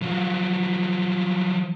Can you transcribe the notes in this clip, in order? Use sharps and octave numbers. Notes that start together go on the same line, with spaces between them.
F3 F#3